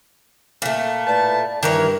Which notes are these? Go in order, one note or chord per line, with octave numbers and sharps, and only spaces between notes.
A#2 A3
A2 B4 D5 A5
G2 D#3 E3 A#4 C#5